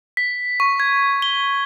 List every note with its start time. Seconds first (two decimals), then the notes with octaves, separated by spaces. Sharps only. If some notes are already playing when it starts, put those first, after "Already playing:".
0.17 B6
0.60 C#6
0.80 G#6
1.22 G7